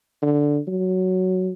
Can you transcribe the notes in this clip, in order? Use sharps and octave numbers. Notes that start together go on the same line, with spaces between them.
D3
F#3